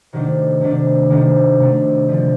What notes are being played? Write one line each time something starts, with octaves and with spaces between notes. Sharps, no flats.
C3 D#3 F#3 A3 D4
C3 D#3 F#3 A3 D4
C3 D#3 F#3 A3 D4
C3 D#3 F#3 A3 D4
D3 F3 A3